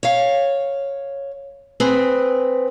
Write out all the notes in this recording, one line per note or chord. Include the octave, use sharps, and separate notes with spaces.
C#5 F5
C4 G#4 B4 G#5